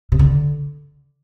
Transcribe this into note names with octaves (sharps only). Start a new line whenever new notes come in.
C3
D3